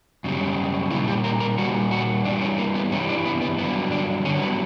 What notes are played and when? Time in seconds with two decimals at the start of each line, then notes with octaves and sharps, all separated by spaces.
0.24 F#2 C#3 G3
0.91 A#2 G3 E4
1.08 G4
1.24 A#4
1.40 A#4
1.58 A#2 G3 F#4
1.91 F#4
2.24 G2 E3 G3 D4
2.41 C#4
2.58 A#3
2.75 B3
2.91 G2 E3 G3 C#4
3.09 D4
3.26 B3
3.42 B3
3.59 G2 D3 F#3 B3
3.92 D4
4.25 G2 D3 F#3 C#4
4.42 B3